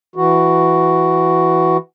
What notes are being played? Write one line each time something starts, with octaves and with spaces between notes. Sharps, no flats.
E3 F#4